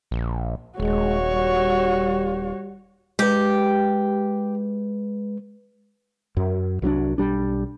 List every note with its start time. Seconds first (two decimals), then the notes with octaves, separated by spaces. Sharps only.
0.11 A#1
0.80 D#1 G#3 F#4 C#5
1.32 G3
3.19 G#3 G4 B4
6.37 F#2
6.82 C2 F#3 C#4 D4
7.18 B1 G3 D4